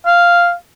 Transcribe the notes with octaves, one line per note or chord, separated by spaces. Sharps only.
F5